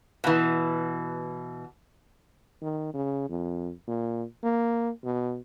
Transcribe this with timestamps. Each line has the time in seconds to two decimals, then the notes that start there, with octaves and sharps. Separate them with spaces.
0.24 B2 E3
2.62 D#3
2.93 C#3
3.29 F2
3.88 A#2
4.43 A#3
5.04 B2